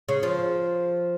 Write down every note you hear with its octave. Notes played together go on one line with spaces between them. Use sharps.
C#3
F3